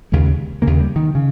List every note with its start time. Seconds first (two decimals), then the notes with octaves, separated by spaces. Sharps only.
0.12 D#2 C#3 G#3
0.62 D#2 C#3 A#3
0.80 G3
0.96 D#3
1.15 C#3